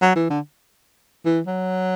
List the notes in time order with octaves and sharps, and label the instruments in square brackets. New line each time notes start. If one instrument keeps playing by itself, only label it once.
[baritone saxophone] F#3
E3
D3
E3
F#3